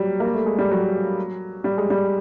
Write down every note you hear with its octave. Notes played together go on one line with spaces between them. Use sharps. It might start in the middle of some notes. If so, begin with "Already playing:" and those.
Already playing: F#3 G3
A#3
A3
G#3
G3
F#3
G3
G#3
G3